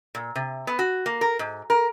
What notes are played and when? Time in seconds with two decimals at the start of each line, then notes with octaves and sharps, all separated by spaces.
0.15 A#2
0.35 C3
0.67 B3
0.79 F#4
1.06 A#3
1.21 A#4
1.39 G#2
1.70 A#4